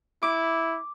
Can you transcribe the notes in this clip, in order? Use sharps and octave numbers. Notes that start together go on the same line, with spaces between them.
E4 D6